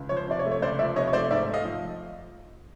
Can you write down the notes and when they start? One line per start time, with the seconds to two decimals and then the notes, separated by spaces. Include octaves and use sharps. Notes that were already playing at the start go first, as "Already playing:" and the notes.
Already playing: C#2
0.09 F3 C#5
0.17 C5
0.28 C3 D5
0.39 C#5
0.45 A3
0.52 C#5
0.62 C#2 C5 D5
0.79 F3 D5 E5
0.96 C3 C#5 D#5
1.07 C#5
1.13 A3 C5 D5
1.31 G#2 D5 E5
1.48 A3
1.54 D#5 F5
1.65 F3